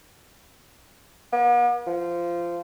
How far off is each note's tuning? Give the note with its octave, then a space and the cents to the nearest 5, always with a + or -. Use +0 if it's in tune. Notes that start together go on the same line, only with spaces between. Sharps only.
B3 -45
F3 -15